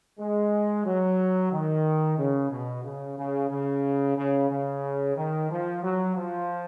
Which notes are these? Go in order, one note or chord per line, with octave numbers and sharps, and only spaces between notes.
G#3
F#3
D#3
C#3
B2
C#3
C#3
C#3
C#3
C#3
D#3
F3
F#3
F3